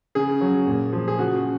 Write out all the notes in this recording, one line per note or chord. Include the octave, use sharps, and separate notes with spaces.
C#3 G#4
F#3
A#2
F3
G#4
C#3 F#4